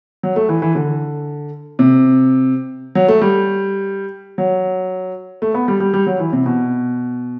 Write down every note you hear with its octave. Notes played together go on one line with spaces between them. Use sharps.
F#3
A3
E3
E3
D3
C3
F#3
A3
G3
F#3
A3
B3
G3
G3
G3
F#3
E3
C3
B2